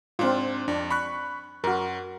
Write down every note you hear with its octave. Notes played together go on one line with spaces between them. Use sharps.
G#2 C4 D4 F4
F2 D4
B5 C#6 F#6
F#2 F#4 A#4